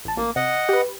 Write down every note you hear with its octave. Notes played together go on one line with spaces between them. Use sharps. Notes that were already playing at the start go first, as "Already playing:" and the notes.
A1 A5
A1 A#3
C3 D#5 F#5
G4 B4